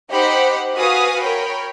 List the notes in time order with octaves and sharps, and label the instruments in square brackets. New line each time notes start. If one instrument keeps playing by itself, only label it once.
[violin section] D#4 G4 C5 F#5 B5
F#4 B4 F5 G#5 D#6
A#4 C#5 G5 B5